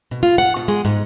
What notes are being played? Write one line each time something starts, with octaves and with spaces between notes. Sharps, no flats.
B2
F4
F#5
B2
G#3
G#2